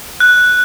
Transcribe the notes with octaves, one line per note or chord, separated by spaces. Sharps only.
F#6